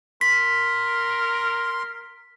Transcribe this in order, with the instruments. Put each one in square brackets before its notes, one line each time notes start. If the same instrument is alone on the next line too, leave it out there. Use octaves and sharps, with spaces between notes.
[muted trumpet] A#4 [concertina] C6 [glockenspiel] B6